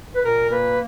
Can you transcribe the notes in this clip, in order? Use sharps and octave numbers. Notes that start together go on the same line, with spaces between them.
B4
A#2 A#4
A#3 B4